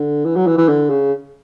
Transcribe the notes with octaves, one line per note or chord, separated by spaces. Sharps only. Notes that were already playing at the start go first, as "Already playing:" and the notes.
Already playing: D3
E3
F#3
E3
E3
D3
C#3